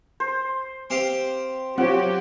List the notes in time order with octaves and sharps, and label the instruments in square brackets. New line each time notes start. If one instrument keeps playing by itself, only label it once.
[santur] C5
[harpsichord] C4 G4 F5
[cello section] F#3 G4 [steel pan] C4 F4 C#5 [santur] F#5